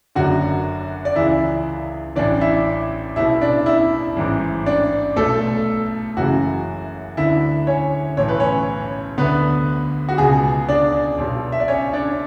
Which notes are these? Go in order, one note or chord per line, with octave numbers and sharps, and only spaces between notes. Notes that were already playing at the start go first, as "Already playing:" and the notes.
F#1 F#2 D3 F#4
D5
C#2 C#3 E3 E4 E5
A1 A2 E3 D4 D5
E4 E5
B1 B2 E4 E5
D4 D5
E4 E5
A1 G#2 E3
D4 D5
B1 B2 A3 A4
F#1 F#2 C#3 E3 F#4
D2 D3 E4 E5
C#4 C#5
B1 A2 E3 C#5
B4
C#4 C#5
D2 D3 B3 B4
F#4
C#2 B2 G#3 G#4
D4 D5
B1 B2
E5
D5
C#4 C#5
D4 D5